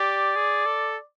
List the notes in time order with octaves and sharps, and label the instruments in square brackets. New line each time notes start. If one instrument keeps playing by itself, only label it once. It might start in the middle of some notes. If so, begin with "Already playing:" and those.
Already playing: [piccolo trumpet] G4 [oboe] D5
[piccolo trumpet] G#4
A4